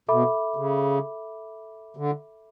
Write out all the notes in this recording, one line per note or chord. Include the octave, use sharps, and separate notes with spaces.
B2 A4 E5 B5 D6
C#3
D3